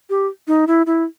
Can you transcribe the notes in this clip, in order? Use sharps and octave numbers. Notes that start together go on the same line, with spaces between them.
G4
D#4
E4
E4